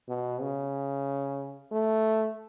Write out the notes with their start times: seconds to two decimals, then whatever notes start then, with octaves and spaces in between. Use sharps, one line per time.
0.09 B2
0.41 C#3
1.71 A3